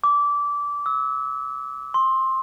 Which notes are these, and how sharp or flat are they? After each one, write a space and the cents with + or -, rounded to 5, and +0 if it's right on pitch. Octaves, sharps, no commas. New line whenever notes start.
D6 -20
E6 -30
C6 +15